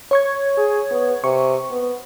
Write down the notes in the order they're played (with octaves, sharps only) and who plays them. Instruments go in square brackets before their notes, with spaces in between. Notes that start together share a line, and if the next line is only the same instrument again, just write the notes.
[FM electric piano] C#5 C#6 G#6
[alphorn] G#4
B3
[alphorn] C3 [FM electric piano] C#6
[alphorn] B3